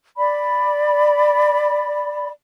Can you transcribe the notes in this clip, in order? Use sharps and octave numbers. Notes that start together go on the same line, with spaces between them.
D5 B5